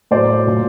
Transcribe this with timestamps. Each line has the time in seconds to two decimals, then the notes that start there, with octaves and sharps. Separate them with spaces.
0.11 A2 F#3 C5 D5
0.46 A#2 F#3